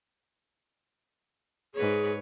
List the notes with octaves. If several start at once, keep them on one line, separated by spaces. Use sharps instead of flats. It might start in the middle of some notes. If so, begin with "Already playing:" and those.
G#2 G#4 B4 C#5